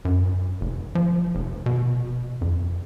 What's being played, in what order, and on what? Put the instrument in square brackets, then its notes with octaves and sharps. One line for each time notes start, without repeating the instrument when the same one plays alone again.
[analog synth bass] F#2
F1
F3
F1
B2
F2